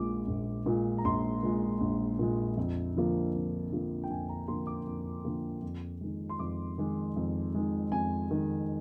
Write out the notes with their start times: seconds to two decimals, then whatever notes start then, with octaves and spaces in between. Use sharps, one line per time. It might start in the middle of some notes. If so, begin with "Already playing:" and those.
Already playing: A#1 A#2 G#3 D6
0.28 A#1
0.66 A#2 G#3
0.98 A#5
1.05 A#1 C6
1.43 A#2 G#3
1.81 A#1
2.19 A#2 G#3
2.57 F2
2.96 D3 F3 A#3
3.34 F2
3.72 D3 F3 A#3
4.04 G5
4.10 F2 G#5
4.29 A#5
4.48 D3 F3 A#3 C6
4.67 D6
4.86 F2
5.25 D3 F3 A#3
5.62 F2
6.01 D#3 G#3
6.29 C6
6.39 F2 D6
6.78 D#3 G#3
7.16 F2
7.54 D#3 G#3
7.92 F2 G#5
8.31 D#3 G#3